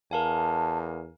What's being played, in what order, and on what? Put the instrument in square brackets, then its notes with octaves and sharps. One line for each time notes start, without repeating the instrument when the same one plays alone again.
[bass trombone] E2 [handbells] A#4 F5 G#5 [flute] A5